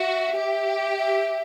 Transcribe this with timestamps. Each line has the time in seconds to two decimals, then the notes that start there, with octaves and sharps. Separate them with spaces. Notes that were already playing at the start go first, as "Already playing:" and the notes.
Already playing: F#4 E5
0.36 G4
0.98 E5